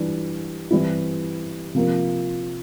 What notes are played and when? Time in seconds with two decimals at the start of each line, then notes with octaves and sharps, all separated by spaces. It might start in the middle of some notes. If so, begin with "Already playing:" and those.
Already playing: E3 G3 D4
0.71 E3 G3 C4 E4
1.75 C3 F3 A#3